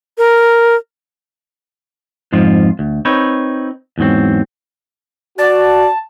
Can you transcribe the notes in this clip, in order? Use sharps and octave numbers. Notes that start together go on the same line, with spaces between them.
A#4
F2 G#2 F3 F4
D2
C4 D#4 B4 C#5
E2 G#2 F#3 C4
F#4 D5 A5